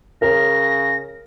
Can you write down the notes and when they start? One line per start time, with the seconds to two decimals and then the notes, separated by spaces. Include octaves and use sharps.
0.22 C#3 A#4 A#6